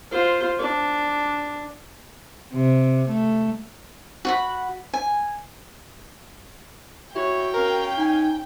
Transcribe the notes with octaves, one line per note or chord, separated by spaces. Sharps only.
F4 C5
D4
C3
A3
F#4 F#5 B5
G#5
E4 F#4 C#5 G5
C#4 A#4 F5
D#4 G#5